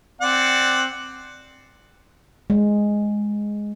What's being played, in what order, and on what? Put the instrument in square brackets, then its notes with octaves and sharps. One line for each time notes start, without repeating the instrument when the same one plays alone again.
[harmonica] C4 D5 F#5
[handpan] G#3